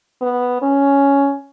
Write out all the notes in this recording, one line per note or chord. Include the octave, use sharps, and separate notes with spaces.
B3
C#4